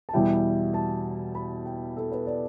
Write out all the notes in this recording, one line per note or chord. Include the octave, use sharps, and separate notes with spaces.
A5
E2 B2 G3 E4 G5
A5
B5
G5
A4
B4
D5